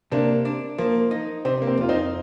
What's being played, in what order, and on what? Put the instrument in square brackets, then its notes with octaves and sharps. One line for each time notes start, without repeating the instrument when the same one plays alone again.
[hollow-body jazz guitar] C3 [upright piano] A#3 D4
[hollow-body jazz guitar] D4
[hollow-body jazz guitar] F3 [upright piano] A#3
[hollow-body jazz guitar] D#4
[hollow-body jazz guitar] C3 [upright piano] C4
[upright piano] A#3
C4
[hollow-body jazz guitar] F2 [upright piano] F4
[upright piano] C4 D#4